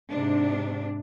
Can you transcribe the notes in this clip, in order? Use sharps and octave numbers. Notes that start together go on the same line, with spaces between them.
G#2 C3 D4